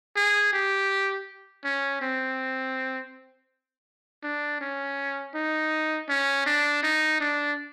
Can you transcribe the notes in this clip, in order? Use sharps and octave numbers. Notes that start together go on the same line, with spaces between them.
G#4
G4
C#4
C4
D4
C#4
D#4
C#4
D4
D#4
D4